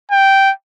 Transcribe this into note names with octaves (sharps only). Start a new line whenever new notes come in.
G5